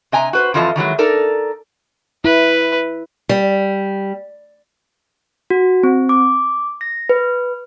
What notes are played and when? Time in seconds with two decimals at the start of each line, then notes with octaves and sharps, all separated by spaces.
0.12 C3 D#5 G#5 A#5
0.33 F#4 B4 C5
0.54 F2 E3 F4 A4 D#5 A5
0.76 D#3 E3 F#3 G#3
0.98 D#4 A4 A#4 D5
2.25 E4 B4
3.29 G3
5.50 F#4
5.83 C4
6.09 D6
6.81 A#6
7.09 B4